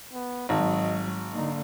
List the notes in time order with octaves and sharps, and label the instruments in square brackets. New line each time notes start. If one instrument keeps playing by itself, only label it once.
[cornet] B3
[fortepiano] G#1 [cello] G#2 F#3 [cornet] D#5
[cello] D3 A#3 [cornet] D#4